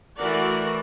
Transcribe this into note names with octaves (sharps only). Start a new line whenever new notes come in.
E3 A3 F#4 A#4 D5